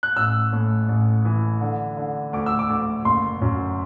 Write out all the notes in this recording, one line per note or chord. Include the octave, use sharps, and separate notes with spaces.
F#6
A1 E6
A2
A1
E3
D3
D3
D2 D6
E6
D6
D2
F#1 C6
F#2